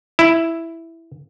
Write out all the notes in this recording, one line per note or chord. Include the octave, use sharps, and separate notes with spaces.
E4